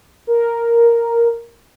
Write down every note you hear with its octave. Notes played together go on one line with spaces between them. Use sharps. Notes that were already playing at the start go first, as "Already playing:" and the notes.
A#4